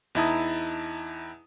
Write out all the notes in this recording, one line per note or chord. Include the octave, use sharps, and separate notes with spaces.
E2 D#4 E4 A5 A#5 D#6